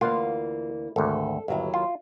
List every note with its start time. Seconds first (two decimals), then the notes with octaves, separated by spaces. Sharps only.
0.01 D2 E3 A#3 F4 F#5
0.96 G#1 D2 A4
1.48 G1 D#2 F#3 E4
1.74 F4